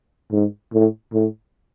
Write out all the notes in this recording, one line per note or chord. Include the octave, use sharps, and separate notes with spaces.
G#2
A2
A2